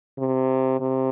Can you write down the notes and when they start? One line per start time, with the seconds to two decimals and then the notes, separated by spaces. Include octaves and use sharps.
0.19 C3
0.80 C3